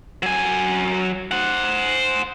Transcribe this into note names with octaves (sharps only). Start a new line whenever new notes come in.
F#3 G#5
C5 F#5